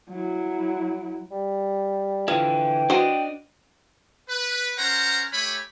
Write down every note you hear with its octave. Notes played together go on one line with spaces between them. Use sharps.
F#3 E4
G3
D3 E3 F3 E4 F5 G5
D4 F#4 C5 D5 D#5
B4
C#4 A#4 C5 F#5 A#5
A3 G4 C#5 G#5 B5